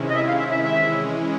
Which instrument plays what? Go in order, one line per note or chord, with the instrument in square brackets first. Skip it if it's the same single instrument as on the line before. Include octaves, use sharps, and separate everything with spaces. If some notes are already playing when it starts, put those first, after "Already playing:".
Already playing: [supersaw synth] C3 D#3 G#3 C#4 E4
[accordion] D#5
E5
F5
E5
E5
[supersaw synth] E3 G#3 C#4 E4 [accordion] E5